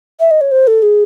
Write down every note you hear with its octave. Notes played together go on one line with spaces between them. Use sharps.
E5
D#5
C#5
C5
A4
G#4